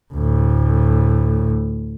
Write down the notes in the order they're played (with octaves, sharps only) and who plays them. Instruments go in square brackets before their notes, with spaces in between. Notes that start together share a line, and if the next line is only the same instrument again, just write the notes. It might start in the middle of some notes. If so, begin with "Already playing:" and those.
[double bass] D2 A2